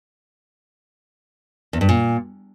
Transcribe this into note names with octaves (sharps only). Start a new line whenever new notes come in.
E2
G2
A#2